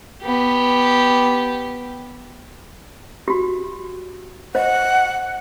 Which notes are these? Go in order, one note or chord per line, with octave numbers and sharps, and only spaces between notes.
B3 G4
F#4 G4
C5 D#5 F#5